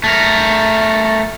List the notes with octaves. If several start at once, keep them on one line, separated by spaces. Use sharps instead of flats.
A3 A#4